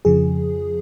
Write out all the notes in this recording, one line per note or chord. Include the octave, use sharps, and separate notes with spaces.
F2 C#3 F3 G#4